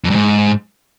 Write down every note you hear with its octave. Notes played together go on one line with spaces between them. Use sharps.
F2
G2
G#2